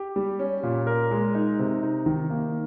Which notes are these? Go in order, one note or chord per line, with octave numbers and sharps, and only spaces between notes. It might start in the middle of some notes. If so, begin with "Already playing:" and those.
Already playing: G4
G3
C#4
A#2
A#4
G#3
D#4
C3
D#4
D#3
A#3